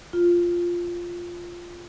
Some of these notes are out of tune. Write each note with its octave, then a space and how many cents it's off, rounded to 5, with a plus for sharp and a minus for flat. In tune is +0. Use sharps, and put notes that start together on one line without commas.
F4 +0